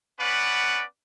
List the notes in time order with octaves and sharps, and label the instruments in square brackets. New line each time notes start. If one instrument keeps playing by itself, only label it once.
[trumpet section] B3 C#4 B4 D5 F#5